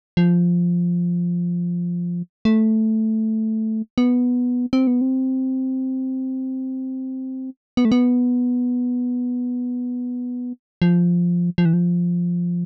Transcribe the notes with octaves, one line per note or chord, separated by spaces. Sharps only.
F3
A3
B3
C4
B3
C4
B3
A3
B3
F3
F3
E3
F3